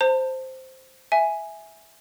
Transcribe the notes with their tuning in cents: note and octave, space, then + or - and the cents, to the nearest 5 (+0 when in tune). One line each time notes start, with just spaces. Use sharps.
C5 +0 A5 +40
E5 +0 G#5 +0